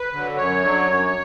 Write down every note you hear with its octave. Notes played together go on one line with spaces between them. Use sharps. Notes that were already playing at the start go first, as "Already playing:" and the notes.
Already playing: B4
D3 F#3
F#2 C#5
D3 F#3
F#2